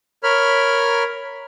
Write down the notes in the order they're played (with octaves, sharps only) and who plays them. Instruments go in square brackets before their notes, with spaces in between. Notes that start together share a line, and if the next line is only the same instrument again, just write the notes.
[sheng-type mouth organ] A#4 C#5 B5 F6